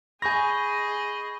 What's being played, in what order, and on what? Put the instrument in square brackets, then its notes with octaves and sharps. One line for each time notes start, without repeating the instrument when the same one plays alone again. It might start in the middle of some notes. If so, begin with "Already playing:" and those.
[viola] G#4 D#5 [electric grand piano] G#5 A#6 [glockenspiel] B5 C#6 G6